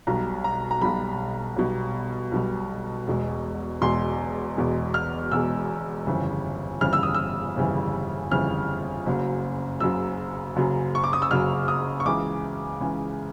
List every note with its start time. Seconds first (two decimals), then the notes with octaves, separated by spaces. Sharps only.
0.07 B1 B2 G3 A#5
0.44 A#5
0.71 A#5
0.81 B1 B2 G3 B5
1.56 B1 B2 G3
2.32 B1 B2 G3
3.07 E1 E2 B2 G#3
3.81 E1 E2 B2 G#3 C6
4.56 E1 E2 B2 G#3
4.94 F6
5.31 E1 E2 B2 G#3 E6
6.06 G1 F2 C#3 E3 G3
6.81 G1 F2 C#3 E3 G3 F6
6.93 E6
7.03 D#6
7.14 E6
7.56 G1 F2 C#3 E3 G3
8.31 G1 F2 C#3 E3 G3 F6
9.06 F#1 F#2 C#3 F#3
9.80 F#1 F#2 C#3 F#3 E6
10.56 F#1 F#2 C#3 F#3
10.95 C#6
11.04 D6
11.13 D#6
11.22 E6
11.30 F#1 F#2 C#3 F#3 F6
11.68 D#6
12.00 C#6
12.06 C#2 C#3 E3 D6
12.81 C#2 C#3 E3